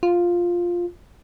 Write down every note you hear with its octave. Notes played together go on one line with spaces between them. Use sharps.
F4